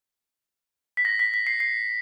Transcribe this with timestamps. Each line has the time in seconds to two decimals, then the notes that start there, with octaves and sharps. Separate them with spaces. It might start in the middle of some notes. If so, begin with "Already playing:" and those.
0.97 B6
1.05 A#6
1.19 B6
1.34 B6
1.47 C7
1.60 C7